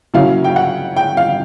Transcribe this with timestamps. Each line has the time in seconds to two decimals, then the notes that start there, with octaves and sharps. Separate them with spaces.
0.14 C#3 F#3 A#3 C#4 E4 F5
0.44 G5
0.56 F#5
0.96 G5
1.17 F5